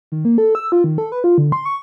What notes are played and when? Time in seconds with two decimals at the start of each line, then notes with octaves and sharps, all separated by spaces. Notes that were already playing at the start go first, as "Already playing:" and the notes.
0.12 D#3
0.25 A#3
0.38 A4
0.55 E6
0.72 F4
0.84 D#3
0.98 A4
1.12 B4
1.24 F4
1.38 D3
1.52 C6
1.65 C#6